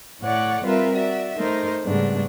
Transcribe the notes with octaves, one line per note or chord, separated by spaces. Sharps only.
A2 A3 C#5 D5 F#5
G3 C4 F4 A#4 B4 E5
F#4 D5 E5
A3 D#4 A#4 C5
G#2 C#3 G3 A3 B3 D4